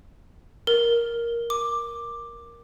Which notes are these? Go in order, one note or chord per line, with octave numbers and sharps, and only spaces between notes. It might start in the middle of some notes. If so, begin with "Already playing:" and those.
A#4
D6